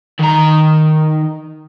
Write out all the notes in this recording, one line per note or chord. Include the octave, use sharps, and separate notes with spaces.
D#3 A#5